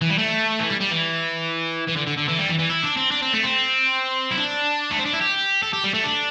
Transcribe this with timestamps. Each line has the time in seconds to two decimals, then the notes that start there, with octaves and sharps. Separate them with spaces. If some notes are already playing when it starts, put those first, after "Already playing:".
0.02 E3
0.10 G3
0.18 A3
0.60 E3
0.70 G3
0.81 G3
0.91 E3
1.88 E3
1.96 D3
2.07 D3
2.17 D3
2.28 E3
2.38 G3
2.48 E3
2.59 E3
2.69 E4
2.84 D4
2.97 C4
3.11 D4
3.22 C4
3.33 A3
3.44 C4
4.31 E4
4.37 D4
4.91 A3
4.99 C4
5.06 D4
5.13 E4
5.21 G4
5.63 A4
5.73 G4
5.84 G3
5.94 A3
6.04 D4